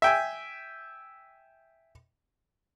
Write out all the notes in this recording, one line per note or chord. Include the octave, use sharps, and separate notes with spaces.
E5 G5 G#5